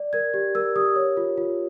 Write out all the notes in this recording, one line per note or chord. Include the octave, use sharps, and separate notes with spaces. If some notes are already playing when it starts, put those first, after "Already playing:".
Already playing: D5
A#4 G#6
G4
A#4 E6
G4 D#6
C#5
F4
F4